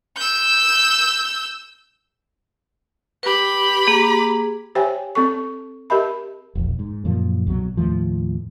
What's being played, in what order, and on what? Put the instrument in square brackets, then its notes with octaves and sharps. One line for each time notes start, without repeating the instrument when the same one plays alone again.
[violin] E6 G6
[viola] G4 B5 [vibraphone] B4
[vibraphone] A#3 G#4
[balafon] G4 C5 C#5 E5 G5 G#5
C4 A4 C#6
G4 A#4 D#5 E5 A5 B5
[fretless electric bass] E1 A#1
G#2
F#2 A#2 F3
C2 B2 F#3
D#2 A2 F3